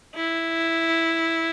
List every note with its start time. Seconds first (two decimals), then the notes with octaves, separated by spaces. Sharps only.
0.16 E4